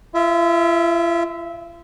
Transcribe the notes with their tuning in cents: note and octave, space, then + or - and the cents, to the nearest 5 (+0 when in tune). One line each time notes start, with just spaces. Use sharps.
F4 -45 E5 -15